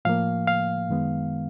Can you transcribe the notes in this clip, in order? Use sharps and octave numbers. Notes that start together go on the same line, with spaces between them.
A2 F3 A#3 F5
F5
F#2 D#3 G#3 B3